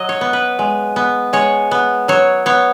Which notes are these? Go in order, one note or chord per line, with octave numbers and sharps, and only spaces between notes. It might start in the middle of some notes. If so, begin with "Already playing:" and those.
Already playing: F#3 D#5
C#5
B3
B4
G#3
B3
G#3 C#5
B3
F#3 C#5
B3 C#5